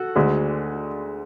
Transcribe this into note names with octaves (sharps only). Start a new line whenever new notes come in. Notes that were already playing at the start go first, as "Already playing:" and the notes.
Already playing: F#4 A4
D2 D3 G#3